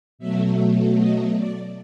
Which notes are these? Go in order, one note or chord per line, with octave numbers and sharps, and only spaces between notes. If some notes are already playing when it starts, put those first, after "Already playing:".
B2 F#3 A3 E5
D#5
D5